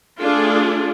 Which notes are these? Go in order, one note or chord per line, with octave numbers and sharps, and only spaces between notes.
A3 D4 F4 G#4 A4